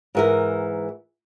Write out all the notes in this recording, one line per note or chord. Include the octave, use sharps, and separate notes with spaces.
G#2 E3 A#4